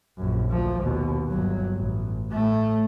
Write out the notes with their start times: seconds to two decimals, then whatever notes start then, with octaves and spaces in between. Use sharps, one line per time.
0.18 A#1 F#2
0.50 D2 F3
0.82 D#2 B2
1.29 G1 F#3
1.75 A1
2.31 A2 A3